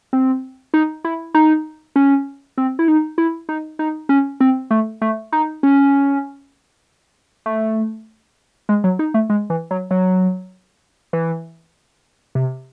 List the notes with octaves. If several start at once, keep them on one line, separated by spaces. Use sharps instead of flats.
C4
D#4
E4
D#4
C#4
C4
E4
D#4
E4
D#4
D#4
C#4
C4
A3
A3
D#4
C#4
A3
G#3
F#3
D#4
A3
G#3
E3
F#3
F#3
E3
C3